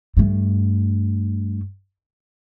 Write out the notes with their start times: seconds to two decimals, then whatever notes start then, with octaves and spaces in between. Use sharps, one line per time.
0.17 G2 A3